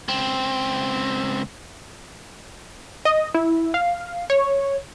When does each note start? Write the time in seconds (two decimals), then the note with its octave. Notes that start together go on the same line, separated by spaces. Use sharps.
0.08 C#2 C4
3.05 D#5
3.34 E4
3.74 F5
4.30 C#5